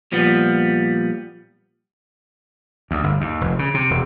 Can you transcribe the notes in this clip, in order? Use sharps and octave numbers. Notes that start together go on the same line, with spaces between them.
A#2 F3 G3 B3
D2
G1
D#2
F1
C#3
C3
E1